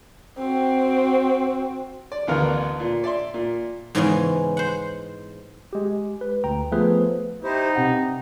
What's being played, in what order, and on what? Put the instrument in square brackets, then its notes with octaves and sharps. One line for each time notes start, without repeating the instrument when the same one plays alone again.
[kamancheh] C4 F#4
[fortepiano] D5
A1 D2 B3 A#4 F5 F6
A#2
D5 E5 C6
A#2
[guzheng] G#2 C#3 E3 G#3 B3 C#4
C5 F#5
[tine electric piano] G#3 G4
B4
D2 G5 A#5
F3 A3 B3 G#4 B4 C5
[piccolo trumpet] D#4 [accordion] E4 G4 C5
[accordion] G2 [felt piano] C3 F#5